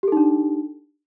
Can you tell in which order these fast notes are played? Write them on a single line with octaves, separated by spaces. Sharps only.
G4 A4 D#4 D4